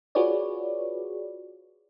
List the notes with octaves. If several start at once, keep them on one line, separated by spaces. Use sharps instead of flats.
F4 F#4 G#4 B4 C#5 D5